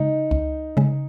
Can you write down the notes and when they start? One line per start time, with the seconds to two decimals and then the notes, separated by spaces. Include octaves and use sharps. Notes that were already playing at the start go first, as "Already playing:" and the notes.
Already playing: C#3 G#3 D#4
0.31 C#2
0.77 C#3 G#3